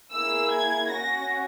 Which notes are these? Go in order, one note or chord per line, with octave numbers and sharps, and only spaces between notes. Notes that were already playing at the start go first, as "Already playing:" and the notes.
A#3 E4 G#4 E6
G#6
C#4 F#4 A#6